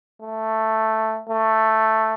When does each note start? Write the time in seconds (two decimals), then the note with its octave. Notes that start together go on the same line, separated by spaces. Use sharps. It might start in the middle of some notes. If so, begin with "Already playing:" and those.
0.22 A3
1.29 A3